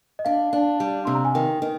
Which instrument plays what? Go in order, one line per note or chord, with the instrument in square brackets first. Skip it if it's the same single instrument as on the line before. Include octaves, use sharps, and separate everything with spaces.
[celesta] D#5
[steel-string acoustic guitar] D4 [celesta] F5
[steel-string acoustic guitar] D4
G3
[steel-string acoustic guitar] C3 [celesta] C6
[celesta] A#5
G#5
[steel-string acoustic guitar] D#3 [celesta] G5
[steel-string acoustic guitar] D#3